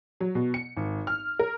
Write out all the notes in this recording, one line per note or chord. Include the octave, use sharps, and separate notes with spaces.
F#3
B2
C#7
G#1
F6
A#4